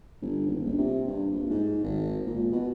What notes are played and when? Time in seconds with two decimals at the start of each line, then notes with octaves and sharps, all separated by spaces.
0.22 G1
0.47 D#1
0.65 A#1
0.78 C3
1.07 G2
1.31 A#1
1.50 G#2
1.84 G#1
2.26 A#2
2.52 B2